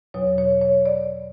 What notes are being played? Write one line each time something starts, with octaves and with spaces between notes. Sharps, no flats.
E2 B2 F#3 C#5
C#5
C#5
D5